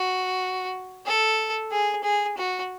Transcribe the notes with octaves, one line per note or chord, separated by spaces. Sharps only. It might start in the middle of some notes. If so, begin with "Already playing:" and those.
Already playing: F#4
A4
G#4
G#4
F#4